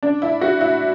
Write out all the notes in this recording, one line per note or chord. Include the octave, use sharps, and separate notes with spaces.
D4
E4
F#4
E4